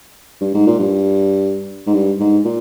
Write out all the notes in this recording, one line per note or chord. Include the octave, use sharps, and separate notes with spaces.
G2
G#2
A#2
G2
G#2
G2
G#2
A#2